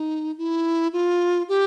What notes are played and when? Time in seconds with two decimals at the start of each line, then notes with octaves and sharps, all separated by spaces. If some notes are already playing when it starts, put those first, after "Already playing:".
Already playing: D#4
0.38 E4
0.93 F4
1.49 G4